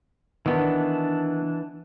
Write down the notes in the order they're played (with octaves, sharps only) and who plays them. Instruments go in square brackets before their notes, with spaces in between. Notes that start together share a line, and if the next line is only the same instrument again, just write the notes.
[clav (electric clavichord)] D#3 B3 [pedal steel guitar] E3 D4